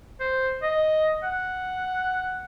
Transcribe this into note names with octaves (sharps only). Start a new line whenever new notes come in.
C5
D#5
F#5